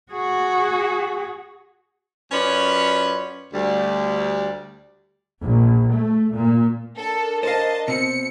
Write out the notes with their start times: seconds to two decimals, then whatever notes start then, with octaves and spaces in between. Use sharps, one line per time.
0.12 F#4 G#4
2.32 F#2 C#4 F4 B4 C#5 D5
3.53 D2 G3
5.42 A#1
5.93 A3
6.33 A#2
6.98 D4 A4 A#4
7.43 C5 D#5 F5 A5
7.88 B2 C4 C#7